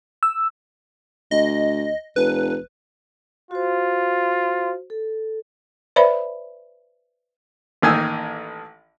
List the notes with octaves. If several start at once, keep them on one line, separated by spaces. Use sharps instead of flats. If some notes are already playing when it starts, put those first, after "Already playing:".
E6
D2 D#5
F1 B4
F4 F#4 C5
A4
B4 C5 D5 E5 B5
A1 D#3 A#3 G#5 E6